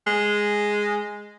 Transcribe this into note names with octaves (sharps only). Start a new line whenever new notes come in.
G#3